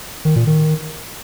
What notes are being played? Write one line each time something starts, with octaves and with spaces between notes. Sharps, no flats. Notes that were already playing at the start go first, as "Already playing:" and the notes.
D#3
A#2
D#3